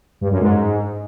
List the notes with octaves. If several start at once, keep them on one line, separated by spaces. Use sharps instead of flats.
G2
F#2
G#2